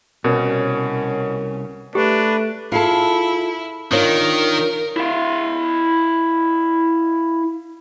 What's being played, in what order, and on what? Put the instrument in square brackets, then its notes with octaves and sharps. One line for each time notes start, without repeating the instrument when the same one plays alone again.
[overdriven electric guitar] C2 [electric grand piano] B2 [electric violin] C#4 [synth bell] A#4 C#5
[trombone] A3 [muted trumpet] D4 [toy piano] G4 [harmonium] B4
[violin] E4 [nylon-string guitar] F4 G#4 A4
[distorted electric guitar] D#3 [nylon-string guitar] D4 F4 C#5 [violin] A#4
[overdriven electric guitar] E4 F5